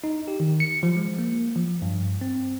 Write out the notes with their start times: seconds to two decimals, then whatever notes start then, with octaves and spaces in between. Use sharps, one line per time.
0.04 D#4
0.28 G4
0.40 D#3
0.60 C#7
0.83 F3
0.96 G#3
1.19 A#3
1.56 F3
1.82 G2
2.21 C4